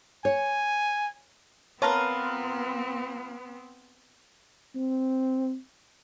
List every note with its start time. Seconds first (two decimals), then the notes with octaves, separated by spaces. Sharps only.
0.25 C#5 G#5
1.82 B3 C4 F4 A#4 B4 C#5 A5 A#5
4.76 C4